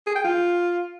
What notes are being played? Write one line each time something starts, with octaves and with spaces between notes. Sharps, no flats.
G#4
G5
F4